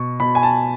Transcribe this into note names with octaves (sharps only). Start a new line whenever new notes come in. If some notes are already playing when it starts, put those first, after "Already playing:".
Already playing: B2 C#6
B2 B5
G#5
A5